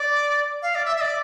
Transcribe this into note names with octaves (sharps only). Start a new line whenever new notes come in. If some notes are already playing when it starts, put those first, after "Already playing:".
Already playing: D5
F5
D5
E5
E5
D5